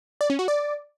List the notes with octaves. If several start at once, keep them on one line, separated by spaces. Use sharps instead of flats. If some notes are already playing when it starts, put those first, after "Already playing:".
D5
C#4
F#4
D5